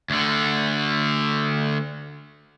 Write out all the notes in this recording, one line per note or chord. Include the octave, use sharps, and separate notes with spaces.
D2 D3